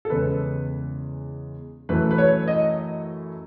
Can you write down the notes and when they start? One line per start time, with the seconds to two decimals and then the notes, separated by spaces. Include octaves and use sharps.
0.05 A4
0.10 E2 C#3 G#3 B4
1.89 F#2 E3 A3 E4 B4
2.11 B4
2.18 C#5
2.48 D#5